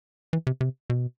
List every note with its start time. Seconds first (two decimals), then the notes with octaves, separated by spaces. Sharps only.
0.33 E3
0.47 C3
0.61 C3
0.90 B2